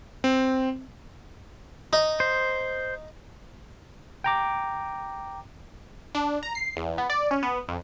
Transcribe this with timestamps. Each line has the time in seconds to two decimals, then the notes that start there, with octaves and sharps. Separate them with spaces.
0.24 C4
1.93 D#4
2.20 C5
4.24 G5 A#5 D6
6.15 D4
6.43 A#5
6.55 C7
6.77 E2
6.98 B3
7.10 D5
7.31 C#4
7.43 B3
7.68 F2